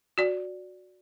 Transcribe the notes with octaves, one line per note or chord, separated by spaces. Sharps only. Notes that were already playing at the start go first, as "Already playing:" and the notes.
F#4 D5